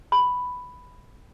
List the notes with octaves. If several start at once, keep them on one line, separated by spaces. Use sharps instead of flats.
B5